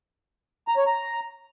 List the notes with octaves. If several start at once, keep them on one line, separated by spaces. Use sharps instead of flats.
A#5
C#5
A#5